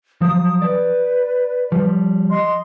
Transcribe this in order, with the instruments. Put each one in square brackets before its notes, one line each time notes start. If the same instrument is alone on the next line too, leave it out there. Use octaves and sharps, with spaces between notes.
[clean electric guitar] F3 F#3 [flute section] D#6
[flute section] B4 [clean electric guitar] D5
[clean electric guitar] F3 G3
[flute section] D#5 C6